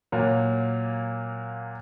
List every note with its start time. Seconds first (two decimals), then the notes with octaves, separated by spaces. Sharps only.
0.12 A#2 F#3 A#3